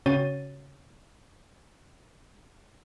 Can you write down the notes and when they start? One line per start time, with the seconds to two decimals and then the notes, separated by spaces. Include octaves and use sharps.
0.06 C#3 C#4 F#4 C#5 A6 D#7